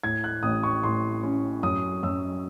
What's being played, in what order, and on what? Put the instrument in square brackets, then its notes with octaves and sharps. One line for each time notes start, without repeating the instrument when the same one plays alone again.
[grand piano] A2 G#6
F#6
A1 D#6
C#6
A2 C6
C#4
F#2 D#6
F#2 E6